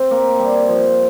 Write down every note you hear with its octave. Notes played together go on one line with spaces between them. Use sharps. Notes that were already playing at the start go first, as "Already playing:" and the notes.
Already playing: C4
A#3
G3
F3